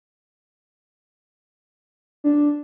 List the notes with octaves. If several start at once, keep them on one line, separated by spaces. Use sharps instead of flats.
D4